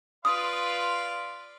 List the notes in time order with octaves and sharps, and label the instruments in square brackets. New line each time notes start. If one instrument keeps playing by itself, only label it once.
[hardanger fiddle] F4 B4 [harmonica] D5 F5 C6 [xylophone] D#6